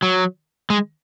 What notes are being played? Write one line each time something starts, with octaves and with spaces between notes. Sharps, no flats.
F#3
G#3